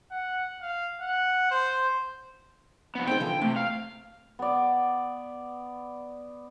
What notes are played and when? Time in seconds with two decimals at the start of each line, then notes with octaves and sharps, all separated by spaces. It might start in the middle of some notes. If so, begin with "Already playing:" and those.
0.11 F#5
0.62 F5
1.01 F#5
1.51 C5
2.95 F3 B3
3.07 C4 D#4 G#4 G5
3.20 D3 E3 F3
3.41 C3 A3
3.56 F5
4.39 B3 D5